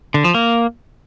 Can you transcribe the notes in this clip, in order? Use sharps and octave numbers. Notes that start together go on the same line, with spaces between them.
D3
F3
A#3